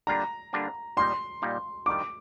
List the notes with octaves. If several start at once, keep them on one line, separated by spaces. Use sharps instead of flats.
D3 G3 A#3 D4 F4 A#5
D3 G3 A#3 D4 F4
A#2 G3 A#3 D#4 C6
A#2 G3 A#3 D#4
D#3 G3 D4 F4 D6